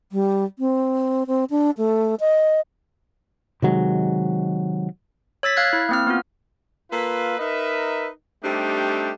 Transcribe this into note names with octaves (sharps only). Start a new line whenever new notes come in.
G3
C4
C4
D4
A3
D#5
C3 D#3 F#3 G#3
C#5 E6 A6 B6
F5 F6 F#6 G#6
E4
A#3 C4 F6
B3 F4
A#3 F4 A4 B4
D#4 A#4 B4 D#5 E5
G3 A3 C4 D4 D#4 G4